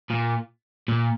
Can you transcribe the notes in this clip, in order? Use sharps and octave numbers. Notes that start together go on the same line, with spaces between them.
A#2
A#2